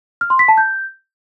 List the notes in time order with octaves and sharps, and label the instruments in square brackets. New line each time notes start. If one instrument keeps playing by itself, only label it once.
[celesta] F6
C6
B6
A5
G6